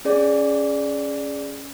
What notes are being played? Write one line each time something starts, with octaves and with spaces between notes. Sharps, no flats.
C#4 G#4 D5